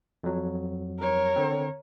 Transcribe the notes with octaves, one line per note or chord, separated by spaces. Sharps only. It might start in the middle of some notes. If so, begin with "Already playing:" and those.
F2 F#3
A#4 C#5
D3 C4